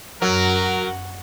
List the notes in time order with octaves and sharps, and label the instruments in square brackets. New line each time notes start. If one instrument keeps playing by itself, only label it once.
[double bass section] F#2 [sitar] F#3 [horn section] F#4 A#4